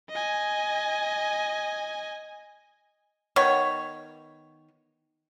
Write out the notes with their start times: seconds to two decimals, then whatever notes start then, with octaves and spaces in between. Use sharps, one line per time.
0.10 D#5 G#5
3.36 D#3 B3 C#5